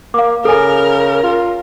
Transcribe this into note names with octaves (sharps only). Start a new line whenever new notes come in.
A#3 F5 D6
C#3 A4 A#4 G#5
F4